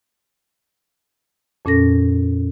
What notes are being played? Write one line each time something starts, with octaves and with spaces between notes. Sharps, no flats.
F2 A#2 C#4 A4 A#6